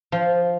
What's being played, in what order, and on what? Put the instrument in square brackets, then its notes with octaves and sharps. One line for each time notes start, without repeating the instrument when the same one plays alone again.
[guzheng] F3